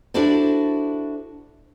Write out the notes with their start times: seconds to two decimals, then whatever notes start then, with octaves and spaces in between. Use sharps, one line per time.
0.14 D4 E4 F#4 A4 C5 D5